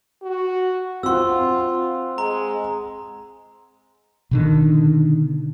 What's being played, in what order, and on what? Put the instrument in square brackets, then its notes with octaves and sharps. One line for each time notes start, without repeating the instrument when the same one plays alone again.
[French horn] F#4
[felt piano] C4 F#5 [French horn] F4 [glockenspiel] C6 E6
[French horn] G#3 [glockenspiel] A#5
[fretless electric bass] B2 D3 D#3